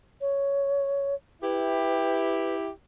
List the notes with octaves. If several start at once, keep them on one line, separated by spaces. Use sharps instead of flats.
C#5
E4 G4 B4